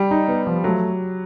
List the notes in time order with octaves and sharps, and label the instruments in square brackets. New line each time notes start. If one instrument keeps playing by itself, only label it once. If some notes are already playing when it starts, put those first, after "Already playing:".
Already playing: [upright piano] G3
[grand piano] D#4
B3
F3
[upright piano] F#3 [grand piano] A3